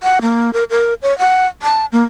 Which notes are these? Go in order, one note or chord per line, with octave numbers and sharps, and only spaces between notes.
F#5
A#3
A#4
A#4
C#5
F#5
A5
A#3